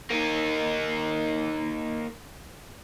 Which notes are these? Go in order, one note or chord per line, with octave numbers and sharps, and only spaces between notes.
A#3 D#4